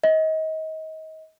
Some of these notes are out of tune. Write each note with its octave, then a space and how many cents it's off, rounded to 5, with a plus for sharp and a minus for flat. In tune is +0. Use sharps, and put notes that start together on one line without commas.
D#5 +30